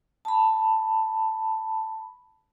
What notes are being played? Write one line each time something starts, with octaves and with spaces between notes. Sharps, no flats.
A5 B5